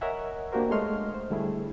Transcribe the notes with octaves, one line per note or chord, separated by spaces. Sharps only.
A#4 C#5 D#5 E5 F#5 G#5
A#3 D4 F#4 G4 A#4 C5
G#3 A3 C#5 D#5 C6 F6
C5
D3 G3 A3 E4 G#4